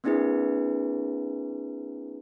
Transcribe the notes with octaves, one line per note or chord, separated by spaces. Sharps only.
A#3 C4 D4 E4 G#4 B4